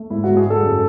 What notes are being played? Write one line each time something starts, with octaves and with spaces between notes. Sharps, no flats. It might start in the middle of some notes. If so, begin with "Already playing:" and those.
Already playing: A3
G#2 E4
F#4
G#2
G#4
G#2 A4
F#2